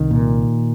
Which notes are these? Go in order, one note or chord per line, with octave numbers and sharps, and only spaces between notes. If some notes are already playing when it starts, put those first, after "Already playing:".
Already playing: C2 D#3
A#2